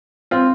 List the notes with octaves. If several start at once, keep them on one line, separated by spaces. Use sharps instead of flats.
C4 F4